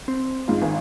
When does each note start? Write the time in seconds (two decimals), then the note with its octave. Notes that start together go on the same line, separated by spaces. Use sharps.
0.08 C4
0.48 G#2 F4
0.61 G#1 G#3